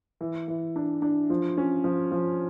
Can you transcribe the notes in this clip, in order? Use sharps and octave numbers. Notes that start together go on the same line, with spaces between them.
E3
E3
D4
D4
F3
C#4
F3
F3